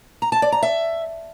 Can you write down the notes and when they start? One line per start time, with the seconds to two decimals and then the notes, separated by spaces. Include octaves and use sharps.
0.22 A#5
0.32 A5
0.42 D5
0.52 A#5
0.62 E5